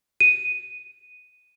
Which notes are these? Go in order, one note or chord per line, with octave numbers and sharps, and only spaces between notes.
D#7